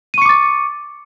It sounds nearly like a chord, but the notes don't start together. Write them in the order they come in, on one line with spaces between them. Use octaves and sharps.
D#7 C#6 C#7 D6 A6